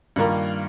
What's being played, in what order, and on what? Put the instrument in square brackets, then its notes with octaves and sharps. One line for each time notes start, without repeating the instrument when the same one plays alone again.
[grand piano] G2 D#3 A#3 F4 A#4